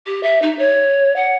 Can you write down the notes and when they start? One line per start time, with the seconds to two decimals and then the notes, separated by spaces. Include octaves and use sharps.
0.06 G4
0.23 E5
0.42 D#4
0.59 C#5
1.16 F#5